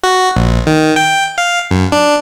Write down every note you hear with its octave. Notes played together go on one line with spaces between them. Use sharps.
F#4
A#1
D#3
G5
F5
F#2
D4